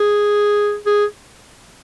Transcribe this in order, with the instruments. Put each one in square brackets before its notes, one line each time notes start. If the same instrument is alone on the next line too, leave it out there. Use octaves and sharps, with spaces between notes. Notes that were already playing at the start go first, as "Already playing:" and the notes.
Already playing: [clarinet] G#4
G#4